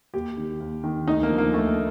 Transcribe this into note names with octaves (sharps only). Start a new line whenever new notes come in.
D#2 G4
D#3
D#2
D#3
D2 D#4
A#3
D3 F3
A#3
D2 A3